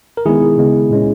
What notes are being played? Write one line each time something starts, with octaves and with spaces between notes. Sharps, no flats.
A#4
D#3 G#3 B3 E4 G#4
C#3 G#3 B3
A#2 G#3 C#4